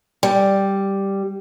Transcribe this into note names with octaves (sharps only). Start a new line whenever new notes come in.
G3